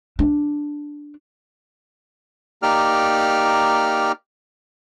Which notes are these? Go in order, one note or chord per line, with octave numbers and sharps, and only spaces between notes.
D4
A#3 D#4 G4 D5 F6